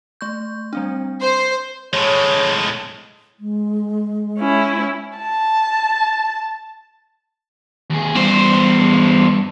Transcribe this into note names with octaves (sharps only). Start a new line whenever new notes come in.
A3 C#6 G6
G3 C4 D4
C5 C6
A2 G#3 C#5
G#3
C#4 E4
A5
D#2 G#4
E2 G2 C5